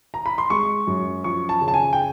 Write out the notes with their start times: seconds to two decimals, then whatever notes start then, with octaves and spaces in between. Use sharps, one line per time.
0.14 A#5
0.26 B5
0.38 C6
0.50 G#3 C#6
0.87 F#2
1.24 F3 C#6
1.49 A5
1.61 C#3
1.68 A5
1.74 G#5
1.93 G5